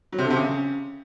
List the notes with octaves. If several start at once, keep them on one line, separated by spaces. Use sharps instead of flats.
F#3
C3
D3
C3
C#3